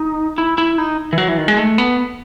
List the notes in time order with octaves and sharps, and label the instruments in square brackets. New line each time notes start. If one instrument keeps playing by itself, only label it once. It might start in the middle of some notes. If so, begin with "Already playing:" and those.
Already playing: [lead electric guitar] D#4
E4
E4
D#4
E3
F#3
E3
D#3
G#3
A3
B3